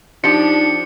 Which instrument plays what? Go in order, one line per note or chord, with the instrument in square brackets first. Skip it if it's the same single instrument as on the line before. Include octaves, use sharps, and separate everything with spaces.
[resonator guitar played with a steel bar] F3 G4 [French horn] D4 [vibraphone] D#4 [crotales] C#7